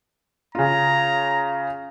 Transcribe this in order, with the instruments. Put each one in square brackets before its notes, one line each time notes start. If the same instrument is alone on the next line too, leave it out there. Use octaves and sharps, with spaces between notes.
[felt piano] C#3 F4 [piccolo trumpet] A#5